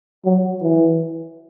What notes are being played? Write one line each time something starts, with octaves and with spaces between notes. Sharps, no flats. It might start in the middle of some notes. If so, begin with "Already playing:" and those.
F#3
E3